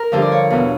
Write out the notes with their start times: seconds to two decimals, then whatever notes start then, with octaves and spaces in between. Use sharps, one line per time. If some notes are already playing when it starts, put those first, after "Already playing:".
Already playing: A#4
0.12 G2 D3 F3 C5
0.22 D5
0.32 C#5
0.50 E2 B2